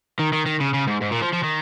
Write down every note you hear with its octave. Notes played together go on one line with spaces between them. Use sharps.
D#3
D#3
D#3
C#3
C#3
G#2
G#2
A#2
F3
F3
D#3